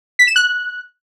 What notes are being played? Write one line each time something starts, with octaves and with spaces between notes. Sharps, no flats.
B6
E7
F#6